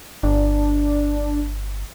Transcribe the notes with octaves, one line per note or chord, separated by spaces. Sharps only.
G1 D4